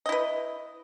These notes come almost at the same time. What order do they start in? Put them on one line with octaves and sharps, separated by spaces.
D#5 E4 B4